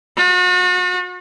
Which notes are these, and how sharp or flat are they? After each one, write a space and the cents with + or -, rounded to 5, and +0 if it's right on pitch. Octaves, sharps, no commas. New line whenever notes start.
F#4 -40